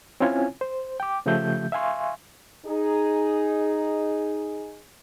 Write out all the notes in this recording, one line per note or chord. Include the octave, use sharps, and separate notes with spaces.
C4 C#4 E4 F4 C#5 G#5
C5
G5 D6
C#3 F3 A3 G4 E5 G6
E5 F5 G#5 C6 C#6
D#4 G#4